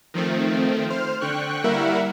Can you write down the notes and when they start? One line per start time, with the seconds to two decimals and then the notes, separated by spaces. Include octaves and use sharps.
0.14 D#3 F3 A3 C4
0.90 C5 F6
1.21 D3 G5 C#6 F#6
1.64 G3 A#3 E4 A#4 E5 F#5